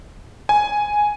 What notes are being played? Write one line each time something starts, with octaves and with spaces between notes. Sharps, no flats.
G#5